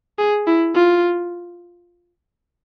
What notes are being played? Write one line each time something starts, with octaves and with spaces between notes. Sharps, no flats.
G#4
E4
F4